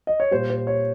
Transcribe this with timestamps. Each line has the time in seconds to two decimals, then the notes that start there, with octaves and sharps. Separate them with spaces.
0.07 D#5
0.20 C#5
0.31 A#2 G3 C5
0.50 C5
0.67 C#5